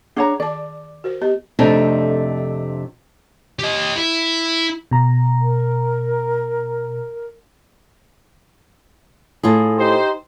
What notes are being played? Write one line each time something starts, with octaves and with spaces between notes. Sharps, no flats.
D4 G#4 C#5 F#5 A#5
D#3 D5 A5
F#4 A#4 C5
B3 G4 D#5
F2 C3 A3 C4 D4 D#4
G4 D#5
E4
B2 A#5
A#4
A2 F4 G#4
D#4 G4 C5